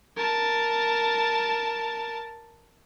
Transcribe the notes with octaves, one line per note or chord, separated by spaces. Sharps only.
A#4 A5